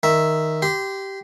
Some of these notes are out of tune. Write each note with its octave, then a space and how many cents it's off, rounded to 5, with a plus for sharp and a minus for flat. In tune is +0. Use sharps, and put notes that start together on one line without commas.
D#3 +0 E5 +0
G4 -10 C6 -25